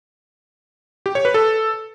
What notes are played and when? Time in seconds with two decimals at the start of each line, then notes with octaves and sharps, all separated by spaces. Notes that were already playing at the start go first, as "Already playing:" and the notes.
1.06 G4
1.15 C#5
1.25 B4
1.34 A4